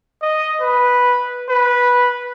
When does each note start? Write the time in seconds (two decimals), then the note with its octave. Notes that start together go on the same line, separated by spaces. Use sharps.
0.22 D#5
0.61 B4
1.49 B4